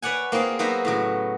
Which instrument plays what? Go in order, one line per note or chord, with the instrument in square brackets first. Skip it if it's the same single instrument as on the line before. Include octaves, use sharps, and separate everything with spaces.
[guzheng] B4 C#5 D5 F#5 G#5
A#3 C4 F4 G#4 F5
F#3 A#3 B3 F#4 C5 E5
A2 C#3 F#3